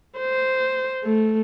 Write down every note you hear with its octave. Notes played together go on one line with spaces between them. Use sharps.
C5
A3